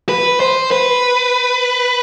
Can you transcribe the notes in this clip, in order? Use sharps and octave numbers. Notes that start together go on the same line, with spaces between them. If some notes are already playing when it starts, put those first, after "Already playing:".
B4
C5
B4